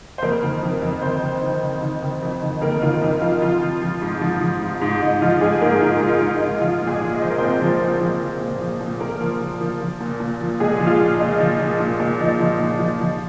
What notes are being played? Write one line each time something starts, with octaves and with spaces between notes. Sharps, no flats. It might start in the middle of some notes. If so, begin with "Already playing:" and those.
C5
F2 A#3 A#4
D#3
F2
F2
D#3 C4 C5
D#3
D#3
D#3
D#3
D#3
F2
D#3
D#3 A#3 A#4
D#3 F4
F2 D#4
F2 F4
F3 F4
F3
F3
G#2
F3
F3
G#2
G#2
G#2 D#4
F3 F4
G#2 G#3 G#4
G#2 A#3 A#4
G#2 F4
G#2
F4
G#2
D#4
G#2
F3 F4
A#2
G#3 G#4
F3
D#5
F3 C5
A#4
A#2 C4 C5
F3
A#2
F3
F3
A#2
F3
A#2
A#2 A#3 A#4
F3
A#2
F3
F3
A#2
A#2
F3
A#2 G#3 G#4
F3
F4
A#2
D#4
A#2
F3
A#2
A#2
A#2
F3 D#4
F3
A#2
F3
F3